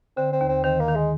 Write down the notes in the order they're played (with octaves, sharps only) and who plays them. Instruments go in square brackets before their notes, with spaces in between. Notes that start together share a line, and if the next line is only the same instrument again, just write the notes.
[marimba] D3 [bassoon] C4
[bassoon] C4
[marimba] D#2
[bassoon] C4
[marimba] D#3 [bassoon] C4
[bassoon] A#3
[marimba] D#3
[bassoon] G#3